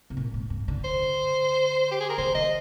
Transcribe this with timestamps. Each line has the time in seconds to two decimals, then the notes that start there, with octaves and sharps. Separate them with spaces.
0.10 C3
0.17 A#2
0.34 G#2
0.50 G2
0.68 D3
0.84 C5
1.91 G4
2.00 G#4
2.10 A#4
2.18 D#3 C5
2.35 D#3 D#5